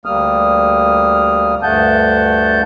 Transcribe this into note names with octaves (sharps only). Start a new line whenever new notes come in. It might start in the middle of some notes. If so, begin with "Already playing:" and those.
D2 G3 A#3 D#6 F6
D2 G2 A3 F#5 A5 G6